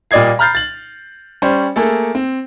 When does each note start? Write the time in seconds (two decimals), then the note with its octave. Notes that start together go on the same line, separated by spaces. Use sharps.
0.11 A#2 G3 D5 D#5 G#6 C7
0.39 A#5 B5 F6 G6 A6 C7
0.55 A6 F#7
1.42 G3 C#4 C5
1.76 A3 A#3 G#4 A4
2.15 C4